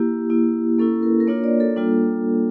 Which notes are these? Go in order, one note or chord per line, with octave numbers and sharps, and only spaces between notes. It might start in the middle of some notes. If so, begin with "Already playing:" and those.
Already playing: A#3 E4 G4
A#3 E4
A#3 C#4 E4 A4
A#4
A#4
A#3 D4 F4 C#5
D5
A4
G3 A#3 D4 F4